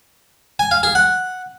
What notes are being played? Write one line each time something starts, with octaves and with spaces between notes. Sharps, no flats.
G#5
F5
G#4
F#5